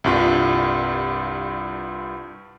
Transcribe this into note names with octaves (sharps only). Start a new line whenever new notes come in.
C2 G2 F4